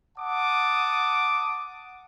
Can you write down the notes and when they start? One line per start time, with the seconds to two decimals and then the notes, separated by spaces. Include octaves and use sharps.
0.18 F#5 A5 D6 D#6